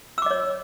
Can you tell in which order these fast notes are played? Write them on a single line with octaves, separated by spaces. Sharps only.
E6 D6 D#5 C#5